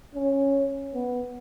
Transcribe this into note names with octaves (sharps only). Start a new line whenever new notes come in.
C#4
B3